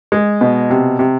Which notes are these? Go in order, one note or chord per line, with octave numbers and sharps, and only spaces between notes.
G#3
B2
C3
C3